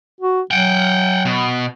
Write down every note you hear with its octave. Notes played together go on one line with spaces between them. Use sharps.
F#4
F#3 F#5 G5
B2